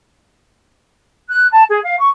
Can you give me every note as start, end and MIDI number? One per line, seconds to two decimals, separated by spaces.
1.28 1.47 90
1.50 1.62 81
1.69 1.78 68
1.83 1.94 77
1.98 2.08 85